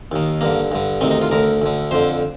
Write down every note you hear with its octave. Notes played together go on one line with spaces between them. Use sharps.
D#2 D#3
G2 D3 A#3
G2 D3
D2 C3 D#3 C4
D#4
F4
D2 D3 A#4
D2 D3
F2 D3 C5